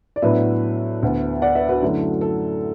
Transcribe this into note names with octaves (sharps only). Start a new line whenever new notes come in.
D5
A2 F#3 B3 D4 B4 E5
D2 D3 B3
D5 F#5
B4 E5
F#4 B4
F#2 D3 F#3 A3 E4
A4